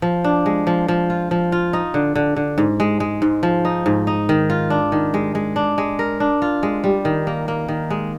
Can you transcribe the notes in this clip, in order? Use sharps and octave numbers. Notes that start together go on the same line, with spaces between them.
F3
D4
G#3
F3
F3
F4
F3
F4
D#4
D3
D3
D3
G#2
G#3
G#3
G#2
F3
D#4
G#2
D#4
D#3
F4
D4
D#3
G#3
G#3
D4
G#3
A#4
D4
F4
G#3
G3
D#3
A#3
A#3
D#3
G#3